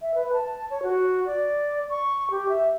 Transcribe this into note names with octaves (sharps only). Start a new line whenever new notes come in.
E5
B4
A5
C#5
F#4
D5
C#6
G4
E5